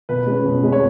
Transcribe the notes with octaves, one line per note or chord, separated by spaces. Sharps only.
B2 B4
G#3 C#4
B2
G#3 C#4
C#5